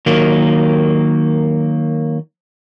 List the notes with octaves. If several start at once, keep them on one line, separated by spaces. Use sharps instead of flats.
D#3 F#3 A#3